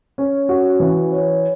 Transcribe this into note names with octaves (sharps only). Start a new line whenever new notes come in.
C#4
F#4
E3
C#5